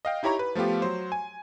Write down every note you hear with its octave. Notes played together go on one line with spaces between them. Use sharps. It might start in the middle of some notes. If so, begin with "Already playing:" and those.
D#5 F5 G5
D#4 E4 G4 C#5 A#5 C#6
B4
F3 A3 B3 F4 G4
F#3 C5
G#5